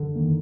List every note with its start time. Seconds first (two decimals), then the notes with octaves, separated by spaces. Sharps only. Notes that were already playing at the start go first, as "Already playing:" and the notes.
Already playing: D3
0.16 D#3 A#3